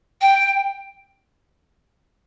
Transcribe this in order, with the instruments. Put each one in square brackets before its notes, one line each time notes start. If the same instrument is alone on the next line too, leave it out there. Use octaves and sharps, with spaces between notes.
[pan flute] G5